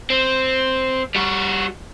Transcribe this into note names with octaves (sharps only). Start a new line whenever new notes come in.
C4
G3 F#4